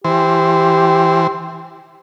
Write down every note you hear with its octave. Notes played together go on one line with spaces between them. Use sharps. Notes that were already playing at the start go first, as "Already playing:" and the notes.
E3 G4 C5